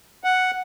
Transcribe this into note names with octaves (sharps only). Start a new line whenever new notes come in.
F#5